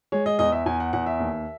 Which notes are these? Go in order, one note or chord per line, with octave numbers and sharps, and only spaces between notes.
G#3 C#5
D#5
E2 D#5
E5
E2 G#5
F#5
E2 F#5
E5
D#2